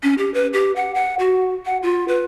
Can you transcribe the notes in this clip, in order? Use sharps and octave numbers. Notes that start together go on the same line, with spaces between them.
C#4
G4
B4
G4
F#5
F#5
F#4
F#5
F4
B4